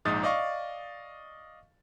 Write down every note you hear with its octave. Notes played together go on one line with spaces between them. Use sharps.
A#1 G#2 D#4 D#6 A6
D5 D#5 F5 C#6